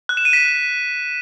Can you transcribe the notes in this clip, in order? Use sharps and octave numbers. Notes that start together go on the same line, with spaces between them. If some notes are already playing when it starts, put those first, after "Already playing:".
F#6
E7
D#7
B6